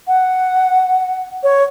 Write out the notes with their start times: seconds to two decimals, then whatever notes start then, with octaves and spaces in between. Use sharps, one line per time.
0.08 F#5
1.43 C#5